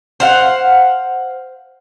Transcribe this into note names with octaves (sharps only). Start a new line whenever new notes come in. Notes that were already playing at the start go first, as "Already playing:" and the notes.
C5 F5 F#5